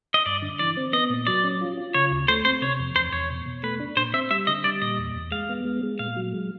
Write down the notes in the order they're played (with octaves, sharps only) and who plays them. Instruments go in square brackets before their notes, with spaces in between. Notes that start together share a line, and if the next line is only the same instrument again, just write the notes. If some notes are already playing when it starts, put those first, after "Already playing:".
[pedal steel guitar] D#5
[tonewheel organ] G2 [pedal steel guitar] D5
[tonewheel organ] D3
[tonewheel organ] E3 [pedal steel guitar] D5
[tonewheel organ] C4
[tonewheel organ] B3 [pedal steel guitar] D#5
[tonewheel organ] A#2
[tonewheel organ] F#3 [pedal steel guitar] D5
[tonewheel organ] C#4
F4
F4
[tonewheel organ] C#3 [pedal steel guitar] C#5
[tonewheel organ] D2
[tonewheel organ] A3 [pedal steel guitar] C5
[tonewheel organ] C4 [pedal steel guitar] C5
[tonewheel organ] C3 [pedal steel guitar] C#5
[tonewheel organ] F2
[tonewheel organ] E2 [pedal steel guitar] C5
[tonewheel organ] E2 [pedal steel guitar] C#5
[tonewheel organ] B2
B2
[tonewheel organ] A3 [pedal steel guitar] B4
[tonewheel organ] D4
[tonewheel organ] A#2 [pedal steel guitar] C5
[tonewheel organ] C4 [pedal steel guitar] E5
[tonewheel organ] G3 [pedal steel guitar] E5
[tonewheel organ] D3 [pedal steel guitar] D#5
[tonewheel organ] G3 [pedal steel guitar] D5
[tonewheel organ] A#2 [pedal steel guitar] D#5
[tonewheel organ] E2
E2
[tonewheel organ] G#3 [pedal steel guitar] F5
[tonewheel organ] B3
G#3
G#3
[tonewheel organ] A#2 [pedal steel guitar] F5
[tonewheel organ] F#3
G#3